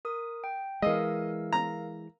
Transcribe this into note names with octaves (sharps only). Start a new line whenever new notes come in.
A#4 D#6
G5
E3 G#3 A#4 D#5 F5 E6
A#5